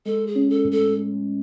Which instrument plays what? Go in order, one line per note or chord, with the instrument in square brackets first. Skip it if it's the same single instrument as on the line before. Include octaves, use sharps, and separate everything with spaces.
[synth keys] G#3 [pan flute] A4
[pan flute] G#4
[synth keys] C#4
[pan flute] A4
[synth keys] A2
[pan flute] A4